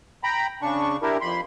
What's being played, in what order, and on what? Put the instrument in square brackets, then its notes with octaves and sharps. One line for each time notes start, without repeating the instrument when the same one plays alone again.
[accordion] G5 A#5 B5
C#3 D4 C#6
D4 E4 G4 A#4
F2 B5 C6